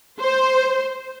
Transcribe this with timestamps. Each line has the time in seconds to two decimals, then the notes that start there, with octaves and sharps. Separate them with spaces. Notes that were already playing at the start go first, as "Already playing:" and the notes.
0.19 C5